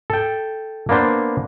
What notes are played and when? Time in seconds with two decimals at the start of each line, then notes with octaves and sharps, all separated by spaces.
0.10 A4 G5
0.89 A#3 B3 D4 C5